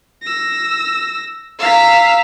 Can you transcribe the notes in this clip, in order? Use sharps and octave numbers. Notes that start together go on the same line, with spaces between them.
E6 A#6
F5 A#5 E6 B6